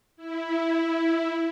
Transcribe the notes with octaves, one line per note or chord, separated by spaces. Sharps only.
E4